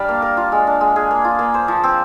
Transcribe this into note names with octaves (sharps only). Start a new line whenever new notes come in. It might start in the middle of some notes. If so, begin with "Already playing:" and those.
Already playing: G3 D4 D5 F5
A#3
A#4
F4
G#3
D4
G#3
G#4
A#3
F4
A#3
C5
F3
C4